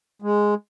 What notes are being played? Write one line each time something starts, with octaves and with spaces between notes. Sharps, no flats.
G#3